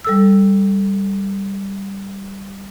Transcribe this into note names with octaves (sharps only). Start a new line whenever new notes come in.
G3 A4 E6